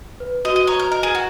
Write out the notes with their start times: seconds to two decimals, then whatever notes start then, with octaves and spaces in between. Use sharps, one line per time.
0.20 B4
0.45 F#4 D#5
0.56 D#5
0.67 C#5 A#5
0.79 A#4
0.91 A#4 D#5
1.03 G#4
1.15 F#4